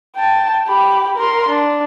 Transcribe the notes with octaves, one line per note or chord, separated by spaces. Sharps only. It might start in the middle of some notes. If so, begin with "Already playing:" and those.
G5 A5
G4 B5
A#4 C6
D4